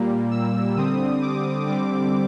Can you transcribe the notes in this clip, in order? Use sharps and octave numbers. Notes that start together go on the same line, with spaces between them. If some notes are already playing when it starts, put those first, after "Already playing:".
Already playing: A#2 G3 A#3
E6
D3 G3 C4 D#6
D6
D3 G3 C4 D6